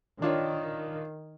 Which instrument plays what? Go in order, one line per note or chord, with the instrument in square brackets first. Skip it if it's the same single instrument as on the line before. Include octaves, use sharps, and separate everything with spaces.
[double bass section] D#3 [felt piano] D4 F4 C#5